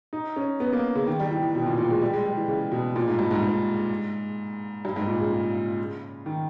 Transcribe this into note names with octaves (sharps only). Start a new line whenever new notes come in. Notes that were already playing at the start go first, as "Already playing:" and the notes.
D#4
C#4
B3
A#3
C#3
D#3
G3
E3
E3
B2
A#2
A#2
G#3
G3
G#3
G3
E3
C#3
B2
A#2
G#2
G2
G#2
G#2
G2
G#2
A#2
C#3
D#3